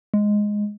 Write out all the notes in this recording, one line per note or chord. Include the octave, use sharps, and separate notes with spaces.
G#3